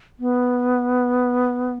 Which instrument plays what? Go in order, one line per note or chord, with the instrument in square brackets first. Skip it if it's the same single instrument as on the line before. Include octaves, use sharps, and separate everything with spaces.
[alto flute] B3